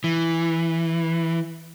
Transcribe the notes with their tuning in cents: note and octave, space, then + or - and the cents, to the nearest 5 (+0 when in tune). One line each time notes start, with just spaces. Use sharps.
E3 +5